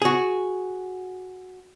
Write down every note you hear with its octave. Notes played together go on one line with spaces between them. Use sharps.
F#4 G#4